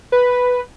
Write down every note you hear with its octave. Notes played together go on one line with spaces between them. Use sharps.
B4